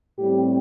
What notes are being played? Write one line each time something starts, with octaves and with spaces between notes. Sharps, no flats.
A2 G3 C4 G4